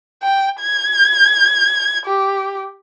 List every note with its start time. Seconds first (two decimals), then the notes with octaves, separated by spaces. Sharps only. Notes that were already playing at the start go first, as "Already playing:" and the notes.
0.23 G5
0.61 G#6
2.06 G4